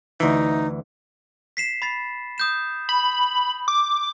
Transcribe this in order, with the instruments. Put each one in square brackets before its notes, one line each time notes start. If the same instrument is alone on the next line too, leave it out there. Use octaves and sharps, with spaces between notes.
[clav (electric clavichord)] D2 E3 [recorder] D#4
[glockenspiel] B6 C7 E7
B5 A6 C7
D#6 G6 E7
[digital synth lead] B5
D6